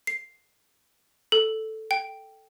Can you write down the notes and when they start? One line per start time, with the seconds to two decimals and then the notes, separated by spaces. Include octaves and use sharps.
0.07 C7
1.32 A4
1.91 G5